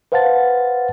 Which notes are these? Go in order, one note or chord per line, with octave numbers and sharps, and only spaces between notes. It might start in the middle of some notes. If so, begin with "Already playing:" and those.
B4 C5 F5 F#5 A5 A6